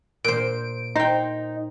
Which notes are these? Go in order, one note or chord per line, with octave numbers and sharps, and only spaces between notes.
A#2 C5 D7
D#4 C5 G5